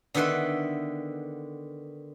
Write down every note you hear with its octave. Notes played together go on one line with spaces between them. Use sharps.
D3 D#3 B3 B4 E5 C6